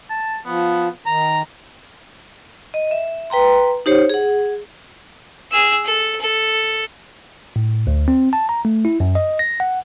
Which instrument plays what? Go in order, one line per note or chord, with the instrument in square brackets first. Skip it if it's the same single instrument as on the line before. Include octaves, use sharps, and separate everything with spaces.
[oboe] A5
[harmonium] F3 [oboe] B3
[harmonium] D#3 [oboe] A#5
[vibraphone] D#5
E5
B4 G5 A#5 C6
D#4 G4 C5 C#5
G#4 F#5
[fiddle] G#4 E6
A4
A4
[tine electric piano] A2
D2
C4
A5
A#5
A3
E4
F#2
D#5
A#6
F#5